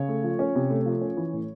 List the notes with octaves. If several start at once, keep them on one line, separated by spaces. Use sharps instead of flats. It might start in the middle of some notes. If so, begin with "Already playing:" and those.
Already playing: C#3 C#5
A3
F3
C#4
C3
A3
F3
C#4
E3
A2